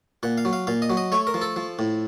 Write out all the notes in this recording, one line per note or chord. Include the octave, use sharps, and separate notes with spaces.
A#2 F#5
F5
F#3
F5
A#2 F5
D#5
F#3
D#5
A3 C#5
A#4
F3
A4
F3
A2